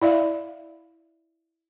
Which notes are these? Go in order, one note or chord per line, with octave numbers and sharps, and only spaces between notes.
E4 D5 E5 F5